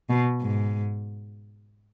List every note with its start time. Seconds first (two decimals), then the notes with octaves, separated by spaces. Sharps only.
0.10 B2
0.42 G#2